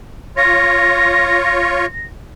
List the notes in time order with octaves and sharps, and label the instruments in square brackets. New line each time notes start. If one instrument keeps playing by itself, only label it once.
[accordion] F4 C#5 [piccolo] A#6